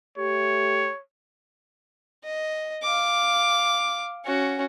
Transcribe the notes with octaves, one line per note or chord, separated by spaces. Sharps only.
A3 G4 C#5
D#5
F5 D6
C#4 F#4